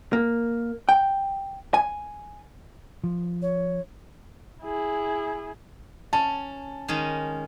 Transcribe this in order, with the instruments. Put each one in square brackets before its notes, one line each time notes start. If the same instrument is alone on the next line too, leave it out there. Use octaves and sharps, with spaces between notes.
[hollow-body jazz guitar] A#3
G5
G#5
[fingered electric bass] F3
[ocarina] C#5
[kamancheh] E4 G#4
[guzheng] C#4 [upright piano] A5
[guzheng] D#3 G#3 C#4